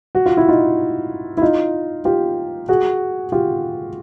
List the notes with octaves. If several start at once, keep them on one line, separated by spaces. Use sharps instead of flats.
F#4
F4
E4
D#4 F4
E4
D#4 F4
F4 G4
F#4 G#4
F4 G4